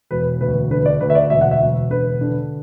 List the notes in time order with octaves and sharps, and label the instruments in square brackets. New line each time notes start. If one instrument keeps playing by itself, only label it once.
[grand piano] E1 B4
D2 B4
D3 B4
D5
D2 B4
E5
D5
E1 E5
F#5
E5
E1
D3 B4
D3